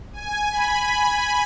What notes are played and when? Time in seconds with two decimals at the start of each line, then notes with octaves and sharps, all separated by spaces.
0.13 G#5
0.51 B5